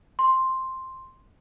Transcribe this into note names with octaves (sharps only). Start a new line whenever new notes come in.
C6